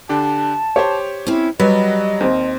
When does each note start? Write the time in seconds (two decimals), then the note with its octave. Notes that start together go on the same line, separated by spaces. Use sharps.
0.09 D3 D4 G4 A5
0.76 G4 C5 C#5
1.27 C4 C#4 E4
1.60 F#3 G3 B4 D#5
2.21 D#2 C4